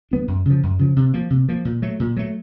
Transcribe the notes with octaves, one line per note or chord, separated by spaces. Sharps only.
F#3 B3 D4
F#2
C#3 F3
F#2
C#3 F3
C3
F3 A#3
C3
F3 A#3
A#2
F#3 A3
A#2
F#3 A3